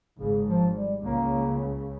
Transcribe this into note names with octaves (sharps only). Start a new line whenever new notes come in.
G#1 G#2 C#3
F3
G3
C#2 C#3 A#3